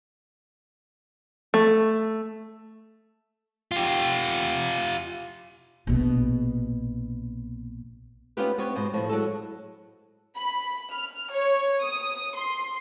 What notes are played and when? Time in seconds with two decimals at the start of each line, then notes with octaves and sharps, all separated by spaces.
1.54 A3
3.72 F4 G4
5.87 A#1 B2
8.37 B3 C#4 D#4 F4 G4 B4
8.58 B3 C4 G4 C#5
8.75 G#2 B2 C5
8.93 A2 F3
9.09 F#3 G#3 A4
10.36 B5
10.91 F6
11.31 C#5
11.81 D#6
12.37 C6